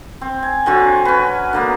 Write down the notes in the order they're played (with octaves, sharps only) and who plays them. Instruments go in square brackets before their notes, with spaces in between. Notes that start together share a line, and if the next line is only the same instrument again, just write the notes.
[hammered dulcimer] C4
G#5
D3 F#3 C4 F#4
C#4 B4
D3 A#3 B3